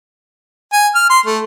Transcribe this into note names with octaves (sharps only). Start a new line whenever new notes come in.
G#5
F6
C6
A3